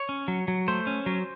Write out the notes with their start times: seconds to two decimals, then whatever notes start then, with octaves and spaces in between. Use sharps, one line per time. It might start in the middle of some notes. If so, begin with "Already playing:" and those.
Already playing: C#5
0.09 C#4
0.28 F#3
0.48 F#3
0.68 A3 C5
0.87 C#4
1.06 F#3